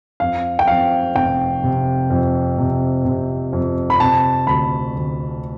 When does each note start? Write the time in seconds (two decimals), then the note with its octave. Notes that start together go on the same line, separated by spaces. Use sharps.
0.20 F2 F5
0.59 G5
0.68 F2 F5
1.15 F1 G5
1.64 C3
2.10 F2
2.58 C3
3.05 C3
3.53 F2
3.90 B5
4.00 C3 A5
4.47 D2 B5
4.95 D2